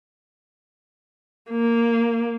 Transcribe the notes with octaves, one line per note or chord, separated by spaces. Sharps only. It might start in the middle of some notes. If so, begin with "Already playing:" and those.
A#3